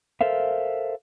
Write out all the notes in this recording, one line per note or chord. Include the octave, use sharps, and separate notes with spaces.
A4 A#4 C5 E5 F5